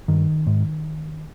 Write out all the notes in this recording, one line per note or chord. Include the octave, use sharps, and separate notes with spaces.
G2 D#3
G#2